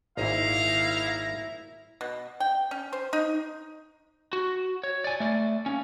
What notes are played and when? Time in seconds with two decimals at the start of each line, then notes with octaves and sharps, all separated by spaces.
0.17 G#1 A#2 A#3 D#4 E4 F5 A#5
2.01 B2
2.40 G5
2.71 C#4
2.93 C5
3.13 D#4
4.33 F#4
4.83 C#5
5.04 D5 G#5
5.20 A3 D5
5.66 A#3 C#4